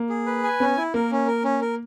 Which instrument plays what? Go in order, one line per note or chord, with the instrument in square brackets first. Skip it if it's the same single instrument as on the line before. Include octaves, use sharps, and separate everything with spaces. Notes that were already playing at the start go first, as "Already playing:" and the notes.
Already playing: [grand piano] A#3
[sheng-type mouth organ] G#4
B4
G#5
[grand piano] B3 [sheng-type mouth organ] C#4
[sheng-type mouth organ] E4
[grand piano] A#3 [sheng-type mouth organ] A#4
[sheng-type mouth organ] C#4
A#4
C#4
A#4